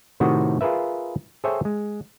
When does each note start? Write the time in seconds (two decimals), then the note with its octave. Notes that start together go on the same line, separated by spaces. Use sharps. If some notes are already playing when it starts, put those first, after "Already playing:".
0.20 A2 C3 D#3 F#4 D#5 A#5
0.61 F4 G#4 A#4 B4 E5
1.44 G#4 A4 C5 C#5 E5 G5
1.65 G#3